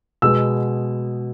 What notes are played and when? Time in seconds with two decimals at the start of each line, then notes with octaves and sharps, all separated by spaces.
0.22 B2 G#3 B3 E6